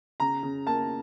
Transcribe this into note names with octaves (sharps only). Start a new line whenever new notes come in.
C#3 A#5
C#3
A#3 A5